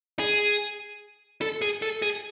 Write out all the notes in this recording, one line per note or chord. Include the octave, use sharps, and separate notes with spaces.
G#4
A4
G#4
A4
G#4